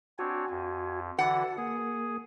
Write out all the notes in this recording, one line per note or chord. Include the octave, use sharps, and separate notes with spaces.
C4 D4 F#4 C#5 G#5
F2
D3 E3 F#4 F#5 A5
A#3 G#4